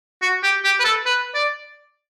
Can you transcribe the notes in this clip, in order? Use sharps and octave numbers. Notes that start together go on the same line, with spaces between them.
F#4
G4
G4
B4
A4
B4
D5